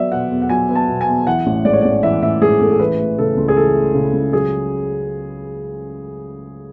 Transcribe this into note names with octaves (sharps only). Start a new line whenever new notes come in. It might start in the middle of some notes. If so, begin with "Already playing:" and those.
Already playing: F#3 B3 D5 E5
B2 F#5
E2
F#5
F#3 G#5
B3
A5
B2
G#5
E2
E3 F#5
A1
G#2 D5
C#5
A1 D5
E3 E5
A1 E5
G#2 G#4
A1 A4
A4
E3 B4
A3
C#3 A4
C#2
G#4
E3 A4
A3
C#3
C#2
F#3 G#4